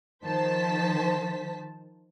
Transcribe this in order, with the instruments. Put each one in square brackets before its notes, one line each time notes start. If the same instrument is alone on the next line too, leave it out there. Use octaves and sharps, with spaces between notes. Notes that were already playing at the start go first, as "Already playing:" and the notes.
[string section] D#3 F3 C5 A5 B6